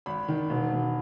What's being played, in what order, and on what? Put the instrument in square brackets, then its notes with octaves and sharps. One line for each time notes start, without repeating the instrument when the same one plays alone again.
[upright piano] G#1 B5
D#3
E1
E1